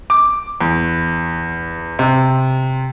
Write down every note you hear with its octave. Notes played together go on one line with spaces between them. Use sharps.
D6
E2
C3